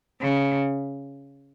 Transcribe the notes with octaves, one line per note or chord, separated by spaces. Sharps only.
C#3